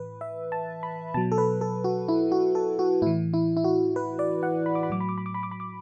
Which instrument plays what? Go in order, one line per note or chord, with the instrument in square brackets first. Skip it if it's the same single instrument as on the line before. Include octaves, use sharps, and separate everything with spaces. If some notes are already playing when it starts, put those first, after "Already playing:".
Already playing: [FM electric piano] A2 E3 B4
E5
A5
B5
B2 F#3 A5
A4
B4
A4
F#4
E4
F#4
A4
F#4
A2 E3 E4
E4
E4
F#4
B4
D5
F#5
B5
D6
B5
A2 F#3 D6
B5
D6
B5
D6
B5
D6
B5
D6